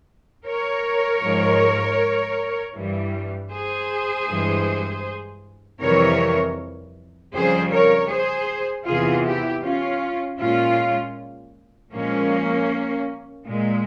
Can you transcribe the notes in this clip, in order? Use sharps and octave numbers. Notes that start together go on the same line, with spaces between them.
A#4 C#5
G#2 F3 G#3
G2 E3 G3
G#4 C5
G2 E3 G#3
F2 C3 E3 G3 A#4 C#5
F2 C#3 G3 G#4 C5
A#4 C#5
G#4 C5
E2 C3 E3 F4 G#4
E4 G4
C#4 F4
A#2 G#3 C#4 F4
A#2 F3 G#3 A#3 C#4
A#2 G#3